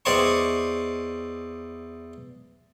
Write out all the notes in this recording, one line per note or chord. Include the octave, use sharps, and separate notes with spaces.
E2 C5 D5 D#5 G#5 C#6